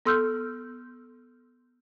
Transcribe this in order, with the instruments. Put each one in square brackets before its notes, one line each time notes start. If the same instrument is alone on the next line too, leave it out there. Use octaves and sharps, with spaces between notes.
[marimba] B3 A4 C6 E6 F6 G6